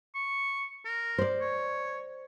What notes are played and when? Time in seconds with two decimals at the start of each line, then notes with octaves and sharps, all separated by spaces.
0.15 C#6
0.85 A#4
1.18 C5 D5
1.41 C#5